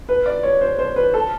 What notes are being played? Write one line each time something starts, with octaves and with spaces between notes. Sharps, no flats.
B4
D5
C#5
C5
C5
B4
A4